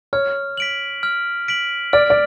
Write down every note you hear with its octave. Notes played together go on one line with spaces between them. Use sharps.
C#5 F6
B6 D7 F#7
F6
B6 D7 F#7
D5 F6
D5